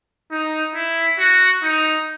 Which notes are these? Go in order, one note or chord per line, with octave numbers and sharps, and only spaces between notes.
D#4
E4
F#4
D#4